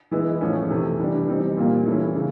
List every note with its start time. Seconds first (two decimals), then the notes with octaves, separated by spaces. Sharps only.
0.11 E3 G#3 B3 E4
0.41 A2 F3 A3 C#4
0.70 C3 E3 A3
0.99 E3 G3 B3 D4
1.28 E3 G3 C4 D#4
1.57 A#2 G3 A#3
1.86 E3 A3 C#4 E4
2.15 C#3